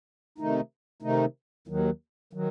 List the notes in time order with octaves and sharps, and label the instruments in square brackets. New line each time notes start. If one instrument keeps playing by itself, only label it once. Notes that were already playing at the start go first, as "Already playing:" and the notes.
[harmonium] C3 D#3 A3 D#4
C3 D#3 A3 D#4
D#2 D#3 F#3
D#3 F#3